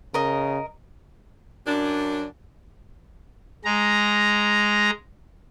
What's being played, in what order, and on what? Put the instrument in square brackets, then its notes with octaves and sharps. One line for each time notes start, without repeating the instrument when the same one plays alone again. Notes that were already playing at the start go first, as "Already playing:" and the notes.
[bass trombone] C#3 [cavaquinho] A#4 D#5
[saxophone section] F#2 D4
[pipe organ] G#3 A#5